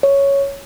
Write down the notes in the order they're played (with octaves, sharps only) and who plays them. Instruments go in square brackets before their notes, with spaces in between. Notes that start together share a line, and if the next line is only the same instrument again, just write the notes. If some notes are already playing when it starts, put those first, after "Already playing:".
[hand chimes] C#5